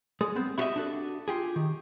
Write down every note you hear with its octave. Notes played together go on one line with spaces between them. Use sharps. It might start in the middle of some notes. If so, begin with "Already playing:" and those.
G#3 G#4 A4
B3 C4
E4 F#4 G4 C#5 D#5 E5
D4 F#4 A4
F4 G4 G#4
D#3